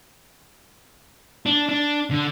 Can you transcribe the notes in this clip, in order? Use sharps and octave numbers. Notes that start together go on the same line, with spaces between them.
D4
D4
D3